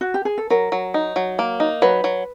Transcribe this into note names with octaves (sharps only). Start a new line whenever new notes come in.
F#4
G4
G#4
A4
F#3 A#4
F#3
D#4
F#3
A#3
D#4
F#3 B4
F#3